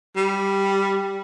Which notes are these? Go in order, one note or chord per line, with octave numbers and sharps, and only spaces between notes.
G3